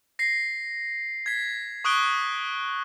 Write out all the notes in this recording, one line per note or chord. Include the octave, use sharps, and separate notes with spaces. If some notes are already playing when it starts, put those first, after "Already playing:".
A#6 C7
G#6 B6
C#6 D#6 F#6 D7 G7